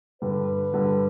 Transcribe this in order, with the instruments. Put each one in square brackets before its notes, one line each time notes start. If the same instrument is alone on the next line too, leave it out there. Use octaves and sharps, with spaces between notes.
[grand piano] G2 D3 G3 [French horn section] B4
[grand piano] G2 D3 G3